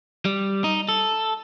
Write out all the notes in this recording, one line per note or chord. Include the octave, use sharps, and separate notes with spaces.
G3
D#4
A4